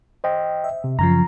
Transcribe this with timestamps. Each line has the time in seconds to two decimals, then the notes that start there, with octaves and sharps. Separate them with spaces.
0.24 C5 D#5 G5
0.64 E5
0.84 C3
0.99 F#2 C#3 F3 A#5